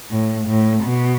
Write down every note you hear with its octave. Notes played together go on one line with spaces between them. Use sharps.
A2
A2
B2